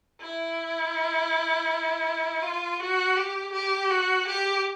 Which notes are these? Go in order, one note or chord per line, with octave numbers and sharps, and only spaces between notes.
E4
F4
F#4
G4
G4
F#4
G4